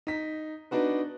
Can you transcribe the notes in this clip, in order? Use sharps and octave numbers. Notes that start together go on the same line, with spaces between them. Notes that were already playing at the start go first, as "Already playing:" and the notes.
D#4 B6
B3 D4 D#4 F#4 B4